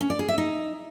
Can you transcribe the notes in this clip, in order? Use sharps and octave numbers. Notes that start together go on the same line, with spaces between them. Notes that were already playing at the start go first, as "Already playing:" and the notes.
C#4
D5
G#4
E5
D#4